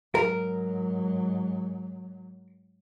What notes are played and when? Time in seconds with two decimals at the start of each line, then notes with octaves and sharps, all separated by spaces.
0.15 G#2 F#3 A#4